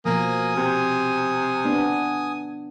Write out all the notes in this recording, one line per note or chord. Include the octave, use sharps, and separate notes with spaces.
B2 F3 A#3 G#5 D#6
C3
B3 D4